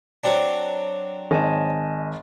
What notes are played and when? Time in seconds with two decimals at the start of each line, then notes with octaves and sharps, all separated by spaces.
0.24 F#3 C4 D4
1.31 G#1 D#5 G#5 A5